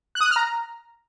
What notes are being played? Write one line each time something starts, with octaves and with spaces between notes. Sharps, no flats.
F#6
D#6
F#6
F6
A#5